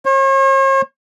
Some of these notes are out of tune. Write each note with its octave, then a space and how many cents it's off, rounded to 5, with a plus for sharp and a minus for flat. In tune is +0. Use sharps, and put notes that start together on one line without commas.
C#5 -45